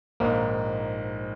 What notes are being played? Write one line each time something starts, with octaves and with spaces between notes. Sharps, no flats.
A#1 G#2 D#3 A#3